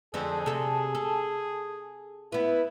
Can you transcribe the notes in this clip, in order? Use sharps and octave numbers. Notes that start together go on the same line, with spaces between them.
F2 D3 C4 G#4
C3 A4
A4
B3 E4 B4